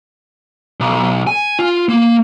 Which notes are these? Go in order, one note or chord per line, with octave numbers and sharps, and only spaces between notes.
B1
G#5
F4
A#3